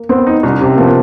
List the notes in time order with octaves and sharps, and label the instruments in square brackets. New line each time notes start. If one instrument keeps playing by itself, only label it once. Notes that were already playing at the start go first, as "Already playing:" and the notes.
Already playing: [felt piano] A#3
[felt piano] B3 [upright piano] C4
[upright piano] D#4
[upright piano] C2 [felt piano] C#4
[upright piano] C3 [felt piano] C4
[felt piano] A#3
[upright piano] F3 [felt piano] B3